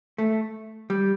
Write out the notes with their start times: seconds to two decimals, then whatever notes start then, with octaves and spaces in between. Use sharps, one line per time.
0.18 A3
0.90 G3